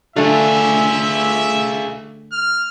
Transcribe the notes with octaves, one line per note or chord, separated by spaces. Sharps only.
D3 A3 F4 G#4 E5
F6